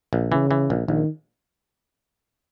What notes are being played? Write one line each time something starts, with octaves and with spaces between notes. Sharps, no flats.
A#1
C#3 E3
E3
A#1
A#1 D#3